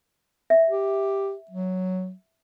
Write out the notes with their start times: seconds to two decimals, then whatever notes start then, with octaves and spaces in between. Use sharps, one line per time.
0.50 E5
0.69 G4
1.51 F#3